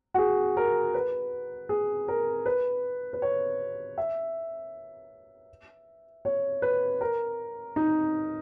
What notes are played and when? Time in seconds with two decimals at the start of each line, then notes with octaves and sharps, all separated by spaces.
0.14 F#4
0.18 G#4
0.57 A#4
0.94 B4
1.69 G#4
2.08 A#4
2.46 B4
3.13 B4
3.22 C#5
3.98 E5
6.25 C#5
6.62 B4
7.01 A#4
7.76 D#4